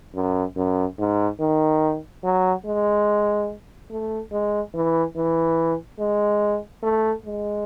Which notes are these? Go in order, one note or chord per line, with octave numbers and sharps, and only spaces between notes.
F#2
F#2
G#2
D#3
F#3
G#3
A3
G#3
E3
E3
G#3
A3
G#3